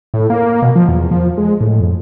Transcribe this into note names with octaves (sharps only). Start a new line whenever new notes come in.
A2
A#3
B2
F3
E2
F3
G#3
A2
F2